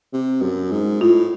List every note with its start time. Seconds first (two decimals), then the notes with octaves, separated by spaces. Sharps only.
0.13 C3
0.42 F#2
0.71 G#2
1.01 A2 F4